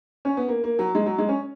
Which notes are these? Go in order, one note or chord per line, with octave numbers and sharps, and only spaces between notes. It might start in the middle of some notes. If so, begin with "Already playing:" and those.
C#4
B3
A#3
A#3
F#3
G#3
F#3
G#3
C#4